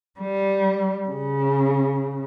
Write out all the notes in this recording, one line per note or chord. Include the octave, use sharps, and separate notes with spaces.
G3
C#3